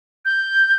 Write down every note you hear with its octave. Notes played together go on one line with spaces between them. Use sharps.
G6